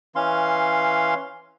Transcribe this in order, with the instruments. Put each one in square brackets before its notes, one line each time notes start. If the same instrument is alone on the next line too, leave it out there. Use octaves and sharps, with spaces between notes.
[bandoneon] E3 C#4 F5 C6